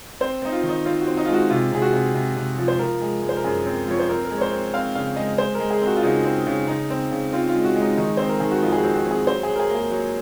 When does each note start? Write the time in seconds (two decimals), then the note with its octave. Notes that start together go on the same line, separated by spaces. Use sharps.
0.20 C4 C5
0.42 C4 D#4
0.52 F4
0.63 D#3
0.69 D#4
0.85 C4 F4
1.01 F#4
1.07 C4
1.17 D#4
1.26 G#3 F4
1.34 F#4
1.50 C3 F4
1.71 C3 G#4
1.82 F#4
1.93 C3
2.15 C3
2.36 C3
2.58 F3
2.68 C5
2.79 F3 A#4
3.01 G#3
3.22 G#3
3.29 C5
3.37 A#4
3.44 F#2 G#4
3.66 C4
3.88 F3 C#5
3.99 C5
4.09 C4 A#4
4.25 A#4
4.31 G#3
4.37 C#5
4.41 C5
4.52 C4
4.73 C4 F5
4.95 C#3 F5
5.16 G#3 D#5
5.38 G#3 C5
5.55 A#4
5.60 G#3
5.71 G#4
5.81 C4
5.87 F#4
5.96 F4
6.03 C#3 D#4
6.24 C4
6.47 C#3
6.67 C#3 D#4
6.90 C4
7.12 C#3
7.33 C4 F4
7.49 F4
7.54 G#3
7.65 F#4
7.76 G#3
7.82 D#4
7.97 D#3 D#4
8.17 C4 C5
8.29 A#4
8.40 D#3 G#4
8.51 F#4
8.62 F2 F4
8.72 G#4
8.78 F#4
8.84 C4
8.94 F#4
9.05 C4
9.11 G#4
9.27 F#3 C5
9.43 G#4
9.49 F#3
9.56 A#4
9.60 G#4
9.70 A#3 G#4
9.91 F#3